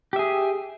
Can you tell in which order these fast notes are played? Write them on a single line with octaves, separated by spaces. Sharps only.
G4 E5 G#4